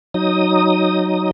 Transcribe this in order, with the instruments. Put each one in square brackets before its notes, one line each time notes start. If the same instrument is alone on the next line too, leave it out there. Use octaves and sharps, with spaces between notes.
[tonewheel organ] F#3 D#4 D#6